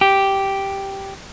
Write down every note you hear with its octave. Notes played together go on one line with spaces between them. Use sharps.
G4